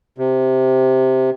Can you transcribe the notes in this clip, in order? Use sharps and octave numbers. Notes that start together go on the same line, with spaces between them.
C3